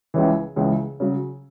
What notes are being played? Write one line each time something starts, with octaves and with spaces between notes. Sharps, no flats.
C#2 C#3 E3
C#2 C#3 E3
C#3 F#3